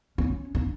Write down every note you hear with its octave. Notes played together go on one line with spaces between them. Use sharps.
C#4
D4